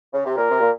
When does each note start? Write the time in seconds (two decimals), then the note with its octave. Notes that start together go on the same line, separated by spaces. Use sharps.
0.13 C#3
0.25 C3
0.36 A#2 A#4
0.50 C3
0.60 A#2